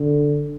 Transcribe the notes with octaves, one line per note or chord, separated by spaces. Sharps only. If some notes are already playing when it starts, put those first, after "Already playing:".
Already playing: D3